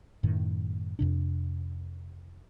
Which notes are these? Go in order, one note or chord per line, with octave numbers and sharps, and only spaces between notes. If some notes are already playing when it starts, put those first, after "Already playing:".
F#2 A2 D#3
F2 C3 D4